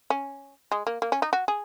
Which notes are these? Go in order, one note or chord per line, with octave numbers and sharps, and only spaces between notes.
C#4
G#3
A#3
A#3
C#4
D#4
F#4
G#4